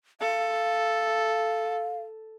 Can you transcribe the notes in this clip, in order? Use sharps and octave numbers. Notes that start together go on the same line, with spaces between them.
A4 F5